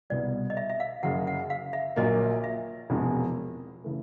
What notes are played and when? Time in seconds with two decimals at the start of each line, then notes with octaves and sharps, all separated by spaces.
0.10 C2 B2 G3 D5
0.50 D#5
0.57 E5
0.70 E5
0.80 F5
1.03 F#1 F#2 C#3 F#5
1.27 F#5
1.50 F5
1.73 E5
1.96 A#1 A#2 F#3 A#3 D#5
2.44 E5
2.90 E1 E2 C3 F3 G#3
3.84 C#3 E3 A3